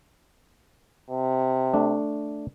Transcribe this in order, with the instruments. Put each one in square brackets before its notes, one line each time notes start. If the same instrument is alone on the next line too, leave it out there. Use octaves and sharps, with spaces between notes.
[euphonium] C3
[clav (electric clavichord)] A3 D4